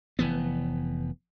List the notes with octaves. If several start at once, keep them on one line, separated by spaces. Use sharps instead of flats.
F1 E3 B3